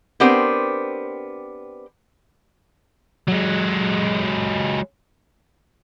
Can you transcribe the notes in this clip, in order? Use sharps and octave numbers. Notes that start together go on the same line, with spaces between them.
B3 C4 D4 G4 A#4 C5
F#3 G#3